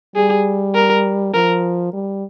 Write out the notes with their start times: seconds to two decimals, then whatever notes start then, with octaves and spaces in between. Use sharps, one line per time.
0.16 G3 G#4
0.75 A#4
1.34 F3 A#4
1.93 G3